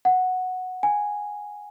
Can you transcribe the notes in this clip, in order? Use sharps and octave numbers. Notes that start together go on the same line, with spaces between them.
F#5
G#5